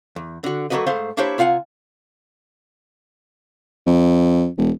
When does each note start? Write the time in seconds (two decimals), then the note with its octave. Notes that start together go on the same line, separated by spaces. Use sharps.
0.16 E2
0.44 D3 F#4
0.70 F#3 A3 A#3 F#4 B4 D#5
0.87 G#2 A3 C5 F5 C6
1.17 A#3 D4 E4 G4 C5 C#5
1.38 C3 F4 F5 F#5 G#5
3.87 F2
4.58 E1